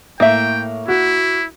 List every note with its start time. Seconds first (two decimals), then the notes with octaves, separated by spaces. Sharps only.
0.20 A2 A#3 E5 G5
0.88 E4 F#4